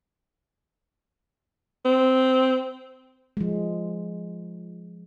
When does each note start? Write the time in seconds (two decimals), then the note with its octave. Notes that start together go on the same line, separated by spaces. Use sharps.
1.85 C4
3.37 F3 G#3